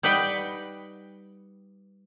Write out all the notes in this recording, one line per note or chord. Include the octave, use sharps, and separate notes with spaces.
G3 D#4 B4 F#5 G5